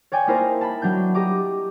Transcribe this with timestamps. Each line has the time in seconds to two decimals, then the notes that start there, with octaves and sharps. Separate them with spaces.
0.12 C#5 D5 G5 G#5
0.27 A#3 D#4 E4 A#4 C5 D#5
0.61 A5 B5
0.82 F#3 D4 G6
1.15 G4 D#5 A#5 D6